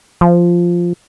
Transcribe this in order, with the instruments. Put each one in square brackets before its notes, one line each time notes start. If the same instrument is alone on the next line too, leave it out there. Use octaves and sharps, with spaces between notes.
[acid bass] F3